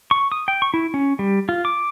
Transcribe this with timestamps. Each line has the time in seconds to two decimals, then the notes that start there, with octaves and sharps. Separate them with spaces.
0.11 C#6
0.32 D#6
0.48 G5
0.62 C#6
0.74 E4
0.94 C#4
1.19 G3
1.49 F4
1.65 D6